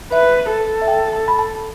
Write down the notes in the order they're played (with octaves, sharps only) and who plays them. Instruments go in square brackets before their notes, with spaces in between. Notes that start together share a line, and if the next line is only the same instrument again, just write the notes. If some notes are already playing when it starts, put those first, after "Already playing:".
[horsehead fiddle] B4 [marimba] E5
[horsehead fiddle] A4
[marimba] E5
G5
A5
B5
A5